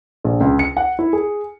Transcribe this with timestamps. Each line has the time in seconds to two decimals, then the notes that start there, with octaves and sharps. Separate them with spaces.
0.24 A#1
0.40 C#2
0.59 C#7
0.77 F#5
0.99 E4
1.13 G#4